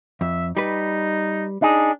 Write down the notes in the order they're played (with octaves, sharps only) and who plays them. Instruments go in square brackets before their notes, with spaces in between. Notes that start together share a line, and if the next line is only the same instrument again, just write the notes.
[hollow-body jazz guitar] F2 [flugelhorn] E5
[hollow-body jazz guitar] G3 B4 [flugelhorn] D#4
[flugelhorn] D4 [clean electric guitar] D#4 G#4